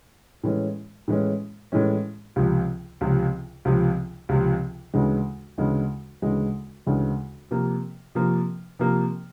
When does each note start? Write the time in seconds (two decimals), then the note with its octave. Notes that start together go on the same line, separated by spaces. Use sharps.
0.43 A2 E3 G#3 C#4
1.08 A2 E3 G#3 C#4
1.72 A2 E3 G#3 C#4
2.36 C#2 C3 F3
3.01 C#2 C3 F3
3.65 C#2 C3 F3
4.29 C#2 C3 F3
4.94 D2 C#3 E3 G#3
5.58 D2 C#3 E3 G#3
6.22 D2 C#3 E3 G#3
6.86 D2 C#3 E3 G#3
7.51 C3 F3 A#3
8.15 C3 F3 A#3
8.79 C3 F3 A#3